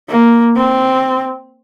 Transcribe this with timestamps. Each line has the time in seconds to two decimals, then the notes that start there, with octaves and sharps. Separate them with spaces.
0.10 A#3
0.56 C4